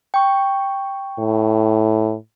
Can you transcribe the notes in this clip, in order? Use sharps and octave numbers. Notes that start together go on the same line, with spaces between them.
G5 C#6
A2